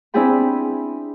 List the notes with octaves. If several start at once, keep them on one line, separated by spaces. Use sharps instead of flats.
C4 D4 E4 G#4 G5 B5